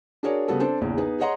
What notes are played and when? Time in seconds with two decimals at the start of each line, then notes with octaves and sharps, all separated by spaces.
0.23 D4 F#4 G#4 A#4 C#5 D5
0.48 C#3 G3 B3 F#4 A4
0.60 C4 D4 A4 C5
0.81 A#1 E2 C#3
0.97 B3 D#4 G#4 B4
1.20 G#4 C#5 D#5 F#5 A#5 C6